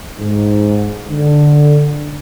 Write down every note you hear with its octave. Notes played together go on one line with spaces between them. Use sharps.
G#2
D3